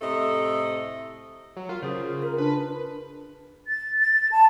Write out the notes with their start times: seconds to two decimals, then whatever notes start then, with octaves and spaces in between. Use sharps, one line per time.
0.01 A2 C3 A3 E4 A4 D#5
1.56 F#3
1.69 F4 A#4
1.83 C#3 F4 G#4 C5
2.23 F4 A#4
2.38 D4 B4
3.67 A6
4.00 A6
4.32 A5